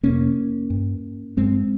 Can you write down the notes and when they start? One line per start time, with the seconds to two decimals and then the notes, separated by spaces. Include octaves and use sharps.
0.03 F2 C3 A#3 C#4
0.70 G2
1.37 G2 G#3 C4